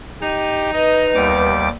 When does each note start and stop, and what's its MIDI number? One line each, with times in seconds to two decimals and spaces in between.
0.22 1.51 63
0.22 0.69 67
0.73 1.53 71
0.73 1.06 75
1.15 1.68 39
1.15 1.68 55
1.15 1.69 59
1.15 1.68 86